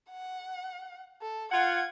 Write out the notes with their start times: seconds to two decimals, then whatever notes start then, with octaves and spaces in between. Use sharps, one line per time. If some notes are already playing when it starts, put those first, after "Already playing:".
0.11 F#5
1.22 A4
1.52 F4 F#5 G#6